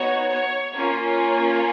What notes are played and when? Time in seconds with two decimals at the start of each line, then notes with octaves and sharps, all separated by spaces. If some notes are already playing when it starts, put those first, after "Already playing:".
Already playing: B3 D#4 F#4 C#5
0.29 C#5
0.73 A#3 C#4 F4